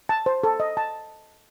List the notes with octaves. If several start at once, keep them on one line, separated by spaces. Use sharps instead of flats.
A5
C5
A4
D#5
A5